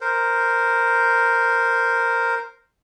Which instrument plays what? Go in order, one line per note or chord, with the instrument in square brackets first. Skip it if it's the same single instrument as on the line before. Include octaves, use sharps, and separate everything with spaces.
[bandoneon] A#4 C5